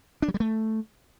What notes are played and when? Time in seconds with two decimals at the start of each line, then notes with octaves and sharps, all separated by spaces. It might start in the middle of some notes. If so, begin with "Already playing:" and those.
0.22 D4
0.28 F#3
0.34 G3
0.40 A3